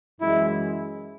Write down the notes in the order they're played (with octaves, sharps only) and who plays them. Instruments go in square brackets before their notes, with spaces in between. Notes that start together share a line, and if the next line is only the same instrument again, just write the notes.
[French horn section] F#2 E3 G#3 [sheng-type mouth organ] E4